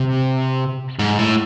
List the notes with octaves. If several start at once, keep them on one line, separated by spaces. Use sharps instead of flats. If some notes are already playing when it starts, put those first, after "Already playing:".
Already playing: C3
G#2
A2